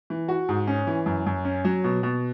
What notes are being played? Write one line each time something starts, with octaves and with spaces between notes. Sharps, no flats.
E3
F#4
G#2
C#4
E3
F#2
F#2
C#4
F#3
B2
B2